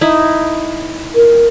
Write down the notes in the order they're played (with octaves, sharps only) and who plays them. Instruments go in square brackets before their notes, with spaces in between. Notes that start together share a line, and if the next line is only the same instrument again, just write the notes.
[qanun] D#4 E4
[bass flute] A#4